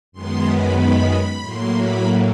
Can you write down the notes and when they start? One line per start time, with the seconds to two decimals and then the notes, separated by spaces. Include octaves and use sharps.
0.12 F#2 D#3 G#3 B3 C6
0.44 B5
0.76 B5
1.08 B5
1.40 A2 F#3 A#3 C6
1.72 B5